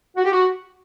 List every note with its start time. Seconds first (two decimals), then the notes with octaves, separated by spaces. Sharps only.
0.16 F#4
0.24 G4
0.32 F#4